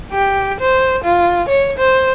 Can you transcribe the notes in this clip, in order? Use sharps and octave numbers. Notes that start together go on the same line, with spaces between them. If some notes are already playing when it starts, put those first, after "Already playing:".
G4
C5
F4
C#5
C5